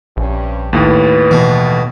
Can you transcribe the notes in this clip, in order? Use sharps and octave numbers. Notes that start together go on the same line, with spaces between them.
A#1 G2 C3 C#4
D#2 A2 B4
B2 E3